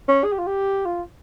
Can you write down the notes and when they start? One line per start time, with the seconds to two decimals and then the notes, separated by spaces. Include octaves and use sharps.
0.08 C#4
0.24 G#4
0.32 G4
0.39 F4
0.47 G4
0.86 F4